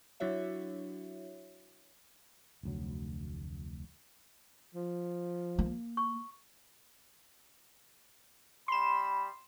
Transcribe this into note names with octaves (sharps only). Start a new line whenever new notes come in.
F#3 D4 E4 F#4 C#5 E5
F1 D2 F#3
F3
A#3
C#6
G3 B5 C6 E7